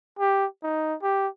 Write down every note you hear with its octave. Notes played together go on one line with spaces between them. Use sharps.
G4
D#4
G4